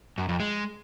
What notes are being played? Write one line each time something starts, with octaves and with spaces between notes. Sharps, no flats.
F#2
F2
G#3